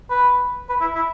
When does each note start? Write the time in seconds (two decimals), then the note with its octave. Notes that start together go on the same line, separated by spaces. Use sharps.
0.10 B4
0.69 B4
0.81 E4
0.95 E4